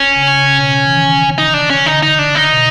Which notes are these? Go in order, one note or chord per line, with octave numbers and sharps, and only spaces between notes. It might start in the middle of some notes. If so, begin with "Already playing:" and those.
Already playing: C#4
C#3
C#3
B2
E3
D#3
D#4
D4
C#4
D3 D#4
D#4
D4
D#4
B2